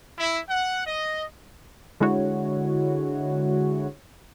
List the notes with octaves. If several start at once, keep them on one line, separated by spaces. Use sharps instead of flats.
E4
F#5
D#5
D3 G#3 E4 F#4 C#5